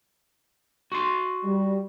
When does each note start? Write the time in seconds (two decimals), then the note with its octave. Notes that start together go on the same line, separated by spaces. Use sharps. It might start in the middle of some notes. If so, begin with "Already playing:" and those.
0.92 F#4 C6
1.45 G3